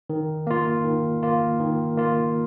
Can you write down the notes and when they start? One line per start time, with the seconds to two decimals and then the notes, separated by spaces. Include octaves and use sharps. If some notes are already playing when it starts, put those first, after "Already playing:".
0.10 D#3
0.47 A#3 F4
0.84 D#3
1.23 A#3 F4
1.60 D#3
1.97 A#3 F4